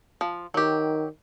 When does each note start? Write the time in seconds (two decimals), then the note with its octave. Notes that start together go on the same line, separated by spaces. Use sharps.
0.21 F3
0.54 D#3 F#3 G4